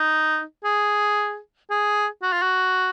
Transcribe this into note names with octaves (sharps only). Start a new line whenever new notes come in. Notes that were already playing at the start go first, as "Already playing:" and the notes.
Already playing: D#4
G#4
G#4
F#4
F4
F#4